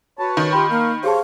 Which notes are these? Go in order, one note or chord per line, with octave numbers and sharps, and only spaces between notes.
F#4 B4 C#5 A5
D#3
F4 G4 G5 B5
A#3 A#4 F5
G4 G#4 C5 C#5 F5 A5